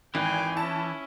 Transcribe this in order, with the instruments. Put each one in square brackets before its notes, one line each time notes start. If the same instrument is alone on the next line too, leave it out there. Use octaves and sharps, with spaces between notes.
[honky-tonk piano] G#1 [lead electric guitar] E3 [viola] G5 G#5
[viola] C#4 E4 [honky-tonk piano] A5